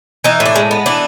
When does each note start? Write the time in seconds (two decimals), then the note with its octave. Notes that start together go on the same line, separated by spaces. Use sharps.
0.24 E3 D#4
0.40 A2
0.46 D4
0.56 G#3
0.71 B3
0.86 E3 D4